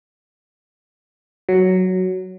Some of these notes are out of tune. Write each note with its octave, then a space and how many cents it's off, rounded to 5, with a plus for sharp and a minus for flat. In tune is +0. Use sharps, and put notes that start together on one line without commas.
F#3 +5